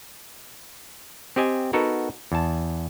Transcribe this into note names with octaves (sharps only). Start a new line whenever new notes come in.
C4 G4 D#5 G#5
B3 D#4 F#4 A4 A#4
E2 A5